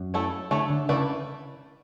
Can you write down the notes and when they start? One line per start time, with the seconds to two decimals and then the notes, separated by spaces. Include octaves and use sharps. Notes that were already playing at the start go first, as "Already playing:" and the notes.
Already playing: F#2
0.14 A3 E4 A4 C#5
0.51 D3 A3 E4 A4 C#5
0.70 D3
0.89 C#3 E3 A3 E4 B4 D5